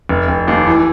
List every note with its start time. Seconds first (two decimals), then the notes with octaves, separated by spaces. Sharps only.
0.09 F1
0.28 F1
0.48 D#2
0.67 E3